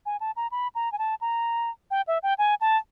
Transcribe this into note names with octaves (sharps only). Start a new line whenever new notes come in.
G#5
A5
A#5
B5
A#5
G#5
A5
A#5
G5
E5
G5
G#5
A5